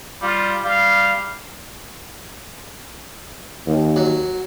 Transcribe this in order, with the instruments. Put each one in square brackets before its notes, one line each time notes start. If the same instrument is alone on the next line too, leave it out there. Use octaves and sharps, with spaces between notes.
[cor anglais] G3 [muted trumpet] F4
[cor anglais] G3 [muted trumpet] F5
[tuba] D#2
[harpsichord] F#3